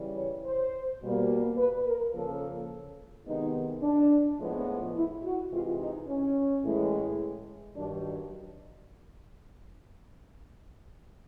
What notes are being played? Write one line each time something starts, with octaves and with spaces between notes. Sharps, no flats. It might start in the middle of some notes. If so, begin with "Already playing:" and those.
Already playing: C#3 E3 G3
C#5
C5
B2 G3 A#3
B4
A#4
C#3 F3 A#3 C#4 A4
C3 D#3 G#3 B3 D#4
D4
A2 F3 G#3 B3
E4
F#4
C3 E3 G#3 F4
D#4
C#4
A2 E3 G#3
G2 D#3 F#3 D4